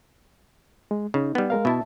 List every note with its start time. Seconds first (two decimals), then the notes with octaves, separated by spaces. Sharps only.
0.91 G#3
1.14 C#3 D#4
1.35 G3 B3
1.50 G#3 A#4 F5
1.65 B2 E4 E5 A5